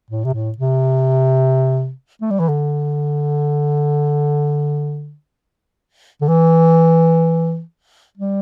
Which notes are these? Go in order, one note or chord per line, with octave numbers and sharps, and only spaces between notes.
A2
C3
A2
C3
A3
G3
E3
D3
D3
E3
G3